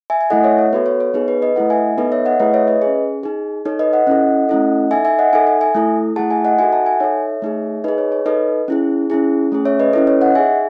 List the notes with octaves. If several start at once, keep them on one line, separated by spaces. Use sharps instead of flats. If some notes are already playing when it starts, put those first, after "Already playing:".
E5 G#5
G#5
A3 E4 A4 D#5 F#5
C#5 E5
C#5
B3 F#4 A4 B4
C#5
C#5
B3 D#4 G#4 B4
B4
B4 D#5
A3 E4 A4 D#5 F#5
E5 G#5
B3 D#4 A4 B4 D#5
C#5 E5
D#5 F#5
A3 E4 G#4 B4 D#5
C#5 E5
B4 D#5
C#4 G#4
D#4 G#4
D#4 A4 C#5
B4 D#5
D#5 F#5
C#4 E4 A4
A3 C#4 E4 A4
D#4 A4 E5 G#5
E5 G#5
D#5 F#5
D#4 A4 E5 G#5
E5 G#5
E5 G#5
A3 E4 A4
A3 E4 G#4 F#5 A5
E5 G#5
D#5 F#5
D#4 F#4 A4 E5 G#5
F#5 A5
E5 G#5
D#4 A4 C#5 E5
A3 D#4 G#4
D#4 G#4 B4 D#5
C#5
C#5
D#4 A4 B4 D#5
C#4 E4 G#4
C#4 E4 G#4
A3 C#4 G#4
C#5 E5
B4 D#5
C#4 E4 A4 B4
C#5
D#5 F#5
D#4 G#4 E5 G#5